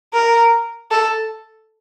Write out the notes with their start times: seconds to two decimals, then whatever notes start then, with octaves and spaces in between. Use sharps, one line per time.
0.14 A#4
0.91 A4